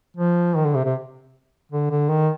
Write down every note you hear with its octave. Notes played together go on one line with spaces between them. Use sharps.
F3
D#3
D3
C3
C3
D3
D3
D#3